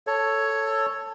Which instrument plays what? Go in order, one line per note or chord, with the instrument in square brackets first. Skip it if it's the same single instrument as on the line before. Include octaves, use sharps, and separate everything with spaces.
[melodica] A4 C#5